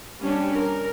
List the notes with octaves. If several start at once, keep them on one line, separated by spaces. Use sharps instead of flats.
G3 C#4 D4
A#4